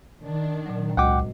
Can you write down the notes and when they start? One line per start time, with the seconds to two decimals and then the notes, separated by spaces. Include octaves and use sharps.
0.23 D#3 D4
0.66 A#2 F#3
0.97 G#1 C#2 F#4 D#5 F#5 G5 D6